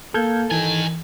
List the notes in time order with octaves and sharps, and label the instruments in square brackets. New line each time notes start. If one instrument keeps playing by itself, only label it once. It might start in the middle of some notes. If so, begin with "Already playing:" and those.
[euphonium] A#3 [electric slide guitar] A4 [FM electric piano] F6 G6 G#6
[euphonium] D#3 [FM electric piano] E3 [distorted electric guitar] A#4 G#5